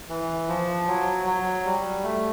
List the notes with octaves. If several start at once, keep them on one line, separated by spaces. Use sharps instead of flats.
E3
F3
F#3
F#3
G3
A3